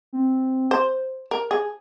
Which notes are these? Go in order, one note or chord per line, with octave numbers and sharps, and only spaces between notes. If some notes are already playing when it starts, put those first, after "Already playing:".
C4
C5
A#4
G#4